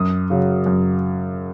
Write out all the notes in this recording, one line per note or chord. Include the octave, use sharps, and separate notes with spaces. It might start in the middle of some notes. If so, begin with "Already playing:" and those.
Already playing: F#2 D#6
C#3 F#3
F#2